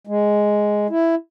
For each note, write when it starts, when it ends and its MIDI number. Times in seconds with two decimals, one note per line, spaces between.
0.07 0.87 56
0.90 1.15 64